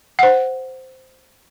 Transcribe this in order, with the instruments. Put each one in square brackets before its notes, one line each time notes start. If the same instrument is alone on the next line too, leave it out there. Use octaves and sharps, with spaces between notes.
[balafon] C5 F#5